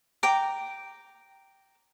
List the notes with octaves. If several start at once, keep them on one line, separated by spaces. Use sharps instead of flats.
G5 A#5 D6